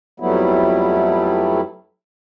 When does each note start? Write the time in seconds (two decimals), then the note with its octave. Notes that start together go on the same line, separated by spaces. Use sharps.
0.20 F2 F#3 G3 A3 B3 E4